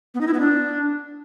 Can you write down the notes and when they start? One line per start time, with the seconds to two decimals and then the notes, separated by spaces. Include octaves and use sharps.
0.14 B3
0.21 D#4
0.27 E4
0.34 B3
0.40 D4